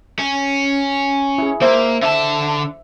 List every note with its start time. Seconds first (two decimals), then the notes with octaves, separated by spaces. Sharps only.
0.19 C#4
1.38 E4 G#4
1.62 A#3 C5 E5
2.03 D3 E5 A5